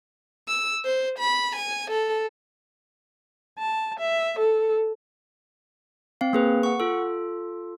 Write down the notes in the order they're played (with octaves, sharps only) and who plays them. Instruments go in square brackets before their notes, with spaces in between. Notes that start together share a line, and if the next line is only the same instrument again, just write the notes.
[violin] E6
C5
B5
G#5
A4
[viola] A5
E5
A4
[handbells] C4 F5
A#3 G#4 B4
F#5 C#6
F4 A4